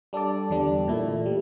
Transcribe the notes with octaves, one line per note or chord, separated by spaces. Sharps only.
G3 D4 A4 D5
E2 D3 G3 D4
A#2 A3 E4
G3